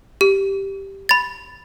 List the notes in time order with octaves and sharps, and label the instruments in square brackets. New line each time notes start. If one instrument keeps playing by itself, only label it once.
[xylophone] G4
B5 A6